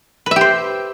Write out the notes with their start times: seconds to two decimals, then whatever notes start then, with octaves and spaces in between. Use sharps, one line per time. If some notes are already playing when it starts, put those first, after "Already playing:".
0.26 B4
0.31 E5
0.36 G4
0.41 C5